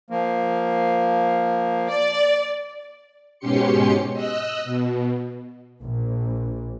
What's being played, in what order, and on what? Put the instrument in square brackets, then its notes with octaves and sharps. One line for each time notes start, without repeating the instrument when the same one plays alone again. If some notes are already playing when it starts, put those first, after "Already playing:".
[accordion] F3 A#3
[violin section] D5
[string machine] G#2 B2 C#4 G4 C6 C#7
D#5 E6 F#6
B2
[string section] A#1